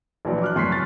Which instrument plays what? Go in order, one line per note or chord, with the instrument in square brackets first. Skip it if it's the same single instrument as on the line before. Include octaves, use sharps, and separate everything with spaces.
[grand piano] A#1 E3 F#3 D5
D6 F6 F#6
F#2 C6 C#6 B6 C7
C#3 C#6 F6 A6